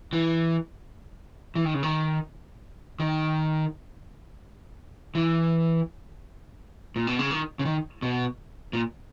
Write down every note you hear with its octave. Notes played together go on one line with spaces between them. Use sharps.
E3
E3
D#3
C#3
D#3
D#3
E3
A#2
B2
C#3
D#3
C#3
D#3
B2
A#2